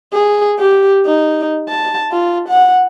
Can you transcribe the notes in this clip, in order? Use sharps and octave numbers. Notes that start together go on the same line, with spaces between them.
G#4
G4
D#4
A5
F4
F#5